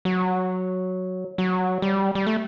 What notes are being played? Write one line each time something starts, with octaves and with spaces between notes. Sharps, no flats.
F#3
F#3
G3
G3
A3